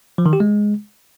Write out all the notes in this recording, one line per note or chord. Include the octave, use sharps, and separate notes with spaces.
F3
D#3
G4
G#3